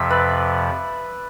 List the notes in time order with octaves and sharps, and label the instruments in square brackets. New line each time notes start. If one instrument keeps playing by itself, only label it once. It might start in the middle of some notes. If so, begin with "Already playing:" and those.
Already playing: [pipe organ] F2 C3 F3 [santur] E5
[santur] B4 D5